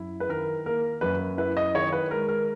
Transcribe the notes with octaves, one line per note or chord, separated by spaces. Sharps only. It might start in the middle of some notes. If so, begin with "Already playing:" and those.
Already playing: F#2 E4
B4
D#3 A#4
A#3 A#4
F#2 B4
E4 B4
D#5
D#3 C#5
B4
G#3 A#4
A#4